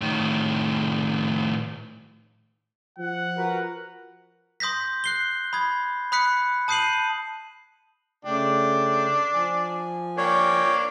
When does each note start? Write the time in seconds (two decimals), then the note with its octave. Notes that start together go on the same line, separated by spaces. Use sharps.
0.01 A2 D#3
2.99 F3 F#5
3.38 F#4 A#4 B4
4.60 C6 D#6 G6 A#6 B6
5.04 F#6 C7 G7
5.53 B5 D#6 G#6
6.12 B5 D#6 F#6 B6 C#7
6.68 A5 D#6 G6 C7 D#7 F#7
8.25 C#3 A3 D4 G5
9.34 F3 G#5
10.18 A#3 D4 C#5 G5